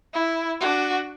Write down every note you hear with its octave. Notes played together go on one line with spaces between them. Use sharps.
E4
D4 F#4